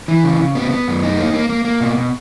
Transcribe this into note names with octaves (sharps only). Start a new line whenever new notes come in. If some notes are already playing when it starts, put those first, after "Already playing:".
E3
C#3
C#3
B3
B3
F#2
D#4
A#3
A#3
A#3
A#3
B2
B2